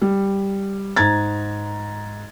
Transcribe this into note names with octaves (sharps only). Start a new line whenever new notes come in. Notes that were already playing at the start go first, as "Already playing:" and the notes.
G3
G#2 A#5 G#6 A6